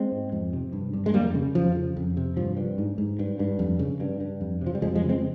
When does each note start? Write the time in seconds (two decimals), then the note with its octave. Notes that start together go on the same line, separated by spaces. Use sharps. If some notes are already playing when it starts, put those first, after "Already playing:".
Already playing: G#3 C4
0.12 G#2
0.32 F2
0.53 C3
0.73 G2
0.93 G2
1.06 G#3
1.14 F2 G3 A#3
1.35 C#3
1.55 F2 F3
1.76 C#3
1.97 F2
2.17 C3
2.37 G2 F3
2.57 G2
2.78 G#2
2.98 G#2
3.19 G2
3.39 G2
3.59 F2
3.79 C#3
4.00 G2
4.20 G2
4.41 F2
4.62 C3 F3
4.75 G3
4.82 F2 F3 G#3
4.95 F3 G#3
5.02 C#3
5.09 G#3 C4